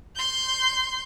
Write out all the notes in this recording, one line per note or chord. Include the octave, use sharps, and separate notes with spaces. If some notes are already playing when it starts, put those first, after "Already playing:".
C6 G6